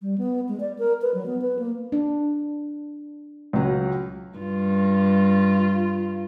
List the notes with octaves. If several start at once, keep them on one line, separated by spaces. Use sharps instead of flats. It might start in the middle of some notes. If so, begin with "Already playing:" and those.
G3
B3
G#3
D5
A#4
B4
F#3
B3
B4
A#3
D4
C#2 F#3
G2 F4